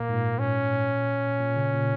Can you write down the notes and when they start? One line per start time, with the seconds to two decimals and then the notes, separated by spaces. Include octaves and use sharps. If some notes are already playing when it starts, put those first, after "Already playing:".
Already playing: A#2 A#3
0.09 G#2
0.13 A#2
0.39 C#4
1.40 A#2
1.56 C#3
1.73 A#2